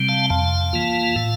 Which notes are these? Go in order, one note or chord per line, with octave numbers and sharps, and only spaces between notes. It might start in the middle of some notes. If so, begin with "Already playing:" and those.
Already playing: C3 G3 C4
F5 A5
F2 F5 A5
E3 A#3 F4
A2